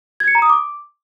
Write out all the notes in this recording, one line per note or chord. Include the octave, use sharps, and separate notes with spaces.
G#6
C#7
A#5
D#6
D6